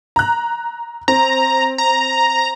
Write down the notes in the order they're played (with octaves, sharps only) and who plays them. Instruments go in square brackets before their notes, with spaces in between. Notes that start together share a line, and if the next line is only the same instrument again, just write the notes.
[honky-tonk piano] A#5 F#6
[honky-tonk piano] C4 [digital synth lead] A#5
[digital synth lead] A#5